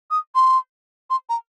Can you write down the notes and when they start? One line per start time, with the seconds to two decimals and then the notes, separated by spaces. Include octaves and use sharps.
0.10 D#6
0.35 C6
1.10 C6
1.29 A#5